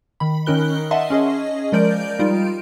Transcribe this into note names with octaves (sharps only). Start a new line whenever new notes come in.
D#3 B5
D#3 C#4 D#4 A#4 F#6 G7
D#5 E5 F#5 A5 C6
C#4 G#4 D#5
F3 G#3 A#4 D5 G6 D7
G3 D#4 F4 D7